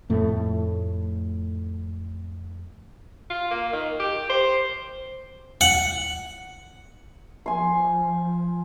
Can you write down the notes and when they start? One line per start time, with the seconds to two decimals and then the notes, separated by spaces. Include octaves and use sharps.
0.09 F2 A2 A3
3.30 F4
3.51 A#3
3.73 D#3
4.00 G4
4.30 C5
5.61 F#5
7.46 F3 G#5 C6